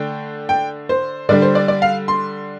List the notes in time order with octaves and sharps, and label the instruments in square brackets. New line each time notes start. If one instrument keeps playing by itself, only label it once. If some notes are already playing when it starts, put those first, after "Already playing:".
Already playing: [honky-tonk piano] D3 A3 D4 G5
G5
C5
D3 G3 D4 D5
C5
D5
D5
F5
C6